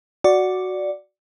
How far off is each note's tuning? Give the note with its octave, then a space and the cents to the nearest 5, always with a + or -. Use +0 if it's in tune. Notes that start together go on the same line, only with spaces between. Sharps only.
F#4 +0 D5 +0